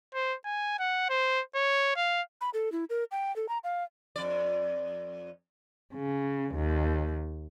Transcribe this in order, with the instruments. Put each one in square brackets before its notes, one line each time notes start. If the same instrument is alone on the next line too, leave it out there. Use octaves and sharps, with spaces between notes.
[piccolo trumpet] C5
G#5
F#5
C5
C#5
F5
[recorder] B5
A4
E4
A#4
G5
A4
A#5
F5
[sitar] F2 D5
[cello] C#3
D#2